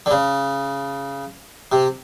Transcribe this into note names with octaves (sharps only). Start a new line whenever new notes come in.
D3
C#3
C3